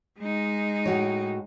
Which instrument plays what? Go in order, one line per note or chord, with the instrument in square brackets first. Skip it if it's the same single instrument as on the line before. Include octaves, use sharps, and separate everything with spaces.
[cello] G#3 D#4
[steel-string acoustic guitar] A2 F#4 C#5